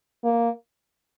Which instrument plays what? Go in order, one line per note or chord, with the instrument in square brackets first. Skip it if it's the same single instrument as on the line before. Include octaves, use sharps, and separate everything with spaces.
[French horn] A#3